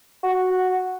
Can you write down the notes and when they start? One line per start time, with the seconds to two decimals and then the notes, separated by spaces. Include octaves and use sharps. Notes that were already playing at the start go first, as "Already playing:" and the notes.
0.23 F#4